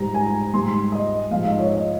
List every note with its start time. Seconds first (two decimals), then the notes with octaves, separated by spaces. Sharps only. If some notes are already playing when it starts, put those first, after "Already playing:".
Already playing: G#2 G3 A#5
0.14 G#5
0.53 G#2 G3 C6
0.92 D#5
1.31 G#2 F3 G#3 F5
1.45 D#5
1.59 C#5
1.73 D#5